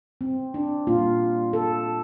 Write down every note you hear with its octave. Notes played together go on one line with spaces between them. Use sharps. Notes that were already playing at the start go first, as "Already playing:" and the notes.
C4
D4
A#2 G3 A#3 F4
A4